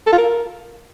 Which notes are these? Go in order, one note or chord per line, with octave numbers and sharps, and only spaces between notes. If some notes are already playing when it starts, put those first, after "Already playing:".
A4
F4
A#4